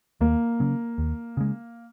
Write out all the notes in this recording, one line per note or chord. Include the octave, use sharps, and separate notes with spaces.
D#2 A#3
C#3 F#3 C#4
D#2
C#3 G#3